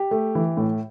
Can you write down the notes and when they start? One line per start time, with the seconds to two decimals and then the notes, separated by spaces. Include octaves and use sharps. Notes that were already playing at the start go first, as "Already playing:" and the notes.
Already playing: G4
0.11 A3
0.35 E3
0.57 A2